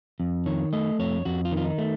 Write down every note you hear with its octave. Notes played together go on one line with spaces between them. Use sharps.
F2
D#3 C#5
A3 D#5
F2 C#5
F2 F#4
F4
D#3
F4
D#4
A3